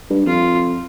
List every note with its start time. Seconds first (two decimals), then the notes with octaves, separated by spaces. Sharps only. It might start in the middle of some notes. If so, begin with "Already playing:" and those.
0.10 G2
0.26 F2 F4